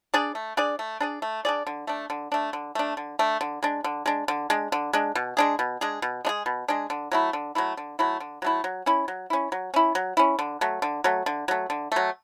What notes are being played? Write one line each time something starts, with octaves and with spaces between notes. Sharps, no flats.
D4 G#4 D5
A3
D4 G#4 D5
A3
D4 G#4 D5
A3
D4 G#4 D5
D3
A3 D4
D3
A3 D4
D3
A3 D4
D3
A3 D4
D3
G#3 D4
D3
G#3 D4
D3
G#3 D4
D3
G#3 D4
B2
G#3 D4 G#4
B2
G#3 D4 G#4
B2
G#3 D4 G#4
B2
G#3 D4 G#4
D3
F#3 A3 E4
D3
F#3 A3 E4
D3
F#3 A3 E4
D3
F#3 A3 E4
F#3
C#4 E4
F#3
C#4 E4
F#3
C#4 E4
F#3
C#4 E4
D3
F#3 A3
D3
F#3 A3
D3
F#3 A3
D3
F#3 A3